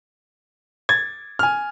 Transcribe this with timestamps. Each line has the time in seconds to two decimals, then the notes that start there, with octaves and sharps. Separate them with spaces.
0.89 G#6 A6
1.39 G#5 F6